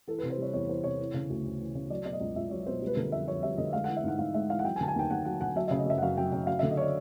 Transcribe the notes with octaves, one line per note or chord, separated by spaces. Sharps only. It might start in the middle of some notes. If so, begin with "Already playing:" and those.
E3 A4
C3 B4
C5
G3 C#5
E2 C#5
E3 C5
C3 C#5
E3
C#3
D2
D2
E3
C#3
F#3 D5
B2 D5
D#5
C#2
C#2 E5
F#3 C#5
B2 C5
G3
B4
D3 A#4
F2 E5
F2 C#5
G3 E5
D3 D#5
G#3 F5
E3 F#5
E5
G#2 F#5
G#2 F5
G#3 E5
E3 F5
F#5
F#3 G5
G#5
D3 A5
G#5
D#2 G5
D#2 F#5
F#3 F#5
D3 F#5
F#3 E5
C#3 E5
D#5
F#2 E5
F#5
F#2 F5
F#3 G5
C#3 G5
F#3 F5
D3 E5
D#5
C#5
D5